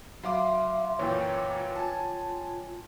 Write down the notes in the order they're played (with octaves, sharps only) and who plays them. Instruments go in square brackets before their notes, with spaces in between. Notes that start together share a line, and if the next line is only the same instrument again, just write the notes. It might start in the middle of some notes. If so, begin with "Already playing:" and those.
[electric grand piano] F#3 F5 D6 [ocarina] E5 [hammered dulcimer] C6
[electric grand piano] F#2 A#2 E3 [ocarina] F4 [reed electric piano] C#5 G5
[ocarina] F4 [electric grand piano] G#5 A5